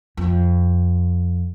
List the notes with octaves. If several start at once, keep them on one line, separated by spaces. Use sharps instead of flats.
F2